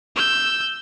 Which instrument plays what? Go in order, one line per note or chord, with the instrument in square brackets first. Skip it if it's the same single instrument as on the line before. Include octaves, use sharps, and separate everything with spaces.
[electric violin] E6 G6